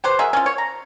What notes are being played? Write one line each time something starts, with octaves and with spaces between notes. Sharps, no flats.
G4 B4 C5
F#3 G#4 A#4 E5
C#4 F4
C#5
A#5